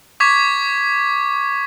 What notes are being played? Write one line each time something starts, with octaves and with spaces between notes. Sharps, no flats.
C#6 D6 G#6 B6